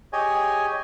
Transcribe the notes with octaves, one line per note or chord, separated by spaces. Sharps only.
G4 G#4 C#5 D#5 G#5